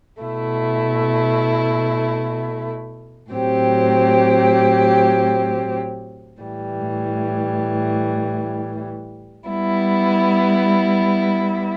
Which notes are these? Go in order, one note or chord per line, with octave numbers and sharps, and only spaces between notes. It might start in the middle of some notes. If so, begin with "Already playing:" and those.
B2 A3 E4
A2 F#3 C4 G4
A2 E3 G3
G3 B3 E4